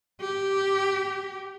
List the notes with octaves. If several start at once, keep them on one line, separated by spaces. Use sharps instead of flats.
G4